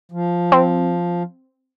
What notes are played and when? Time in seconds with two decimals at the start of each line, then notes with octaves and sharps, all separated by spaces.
0.12 F3
0.52 C4